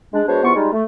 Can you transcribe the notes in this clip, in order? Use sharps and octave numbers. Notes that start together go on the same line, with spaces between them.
G#3 D4
G#3 B3 D4 F#4 C5 C#5
E2 C3 B3 F4 C#6
G3 G#3 D#4 F4
A3